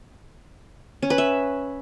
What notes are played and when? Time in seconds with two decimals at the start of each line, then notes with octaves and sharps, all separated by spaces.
1.02 C#4
1.10 B4
1.18 E5